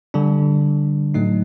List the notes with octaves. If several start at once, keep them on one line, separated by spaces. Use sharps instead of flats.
D3 G3 D4
A2 F#3 A3 D#4